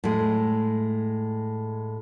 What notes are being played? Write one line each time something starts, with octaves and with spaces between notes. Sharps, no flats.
A2 G#3